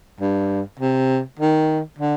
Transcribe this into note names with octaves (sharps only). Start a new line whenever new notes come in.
G2
C3
D#3
D3